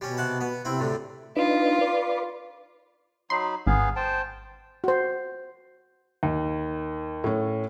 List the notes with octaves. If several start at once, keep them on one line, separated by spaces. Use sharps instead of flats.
B2 G3 C#4
C3 F#5 A5
B3
C3 C4 E4
D2 A2 D3
D4 D#4 F4 B4
B4 D5
F#3 D#4 B5 C6
G#1 B3 G#4 F5
C5 G5 A5
F#4 C5
D#2
A2 C#4